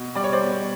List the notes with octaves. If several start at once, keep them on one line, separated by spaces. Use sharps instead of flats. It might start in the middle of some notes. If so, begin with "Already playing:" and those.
Already playing: B2
G3 D5
C#5
C5 D5
B2